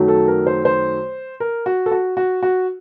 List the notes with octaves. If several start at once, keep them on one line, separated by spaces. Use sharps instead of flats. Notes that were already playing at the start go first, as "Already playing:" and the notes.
Already playing: F#2 D#3 F#3 A3
A4
A#4
C5
C5
A#4
F#4
A4
F#4
F#4
F#4